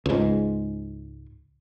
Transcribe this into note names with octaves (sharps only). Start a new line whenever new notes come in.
C#2 G#2